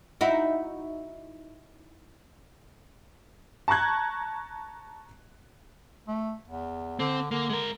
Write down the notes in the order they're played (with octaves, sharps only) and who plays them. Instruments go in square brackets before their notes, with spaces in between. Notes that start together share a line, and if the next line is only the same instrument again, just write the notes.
[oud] D#4 E4 F#4
[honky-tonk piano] A5 A#5 C#6 F#6 G#6
[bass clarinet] A3
E2
[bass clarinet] D3 [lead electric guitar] C4
[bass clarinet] D3 [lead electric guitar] A#3
[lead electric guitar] G#3 A#4